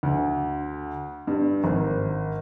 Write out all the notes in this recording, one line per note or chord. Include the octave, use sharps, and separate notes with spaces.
D2
G2
G#1